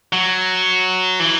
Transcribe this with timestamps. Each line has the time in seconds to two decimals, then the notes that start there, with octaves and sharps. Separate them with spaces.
0.13 F#3
1.20 E3